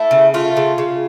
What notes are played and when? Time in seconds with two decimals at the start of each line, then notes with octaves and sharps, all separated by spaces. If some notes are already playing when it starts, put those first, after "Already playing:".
Already playing: A3 E4
0.11 C#3
0.34 A3 F4
0.57 C#3
0.78 C#3